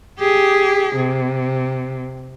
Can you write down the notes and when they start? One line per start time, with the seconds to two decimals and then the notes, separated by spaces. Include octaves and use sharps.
0.19 G4 G#4
0.96 C3